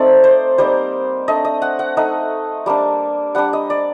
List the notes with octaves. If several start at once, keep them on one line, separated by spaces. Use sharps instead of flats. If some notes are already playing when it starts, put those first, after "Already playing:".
Already playing: A3 C4 D#4 D5
C5
G3 A#3 D#4 C5
A3 D4 D#5
D#5
F#5
F#5
A3 D#4 D#5
G3 A#3 D4
G3 D4 F#5
D#5
D5